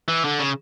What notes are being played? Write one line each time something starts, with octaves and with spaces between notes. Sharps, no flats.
E3
D3
C#3